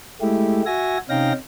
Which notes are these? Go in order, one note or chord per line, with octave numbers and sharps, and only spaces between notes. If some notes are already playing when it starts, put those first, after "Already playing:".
G#3 A3 E4 G4
F#4 E5 G#5 A#6
C3 C#4 D#4 F5 G5 A#6